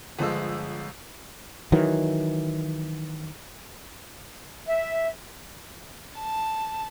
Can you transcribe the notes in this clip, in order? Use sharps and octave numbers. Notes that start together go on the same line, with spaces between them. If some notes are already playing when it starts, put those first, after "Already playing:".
G1 F3 G#3 E6
D#3 E3 F#3
E5
A5